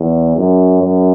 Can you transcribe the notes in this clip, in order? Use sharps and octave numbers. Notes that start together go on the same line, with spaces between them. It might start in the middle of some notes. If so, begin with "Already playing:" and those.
Already playing: E2
F#2
F#2